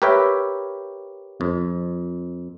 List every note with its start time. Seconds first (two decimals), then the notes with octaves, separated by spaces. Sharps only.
0.02 G4 A#4 B4 C#5 E5 G5
1.41 F2